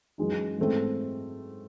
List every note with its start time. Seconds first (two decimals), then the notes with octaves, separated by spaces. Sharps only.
0.18 F#2 E3 G#3 D#4
0.58 G#2 E3 A3 C4